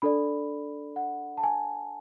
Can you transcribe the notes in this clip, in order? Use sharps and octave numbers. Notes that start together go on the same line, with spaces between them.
D4 A4 D5 B5
F#5
A5
G#5